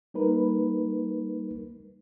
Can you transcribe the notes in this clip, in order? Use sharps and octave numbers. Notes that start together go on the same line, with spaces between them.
G3 A#3 D#4 A#4 B4